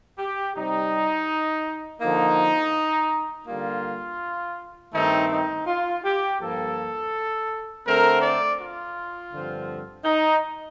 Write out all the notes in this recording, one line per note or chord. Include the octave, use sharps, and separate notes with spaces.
G4
C3 G3 C4 D#4
D3 F3 A#3 D#4
D3 G3 A#3 F4
G2 D#3 A3 C4 D#4
D#4
F4
G4
G2 F3 A#3 A4
D3 A3 C4 A#4
D5
F4
G2 D3 F3 C4
D#4